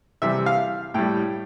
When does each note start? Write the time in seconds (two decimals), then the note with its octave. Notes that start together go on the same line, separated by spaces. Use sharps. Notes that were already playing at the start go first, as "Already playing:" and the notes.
0.22 C3 E3 G3 E5
0.46 F5
0.94 A2 G3 G5